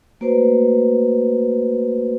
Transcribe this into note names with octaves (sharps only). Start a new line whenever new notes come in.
A3 A#3 F#4 B4 C5